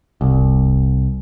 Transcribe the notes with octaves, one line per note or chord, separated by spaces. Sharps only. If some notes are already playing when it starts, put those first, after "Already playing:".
D1 C2